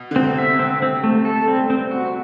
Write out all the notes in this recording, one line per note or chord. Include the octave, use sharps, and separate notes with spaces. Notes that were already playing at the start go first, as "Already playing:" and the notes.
Already playing: B2
D3
C3 C4
E5
C4
C4
A3
A4
A3
G3 C4
C4
F#4